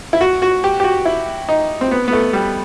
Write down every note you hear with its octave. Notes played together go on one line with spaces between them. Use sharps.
E4
F#4
F#4
G4
G4
F#4
E4
D#4
C4
B3
B3
A3
G3